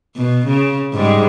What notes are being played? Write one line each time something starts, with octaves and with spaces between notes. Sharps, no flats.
B2
C#3
G#2 G3 G#3